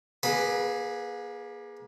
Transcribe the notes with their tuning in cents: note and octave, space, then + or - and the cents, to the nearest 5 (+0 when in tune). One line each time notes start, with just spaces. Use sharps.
A#3 +35 G#4 +0 B4 +0